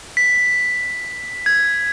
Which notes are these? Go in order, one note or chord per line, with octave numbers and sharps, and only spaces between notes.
B6
G#6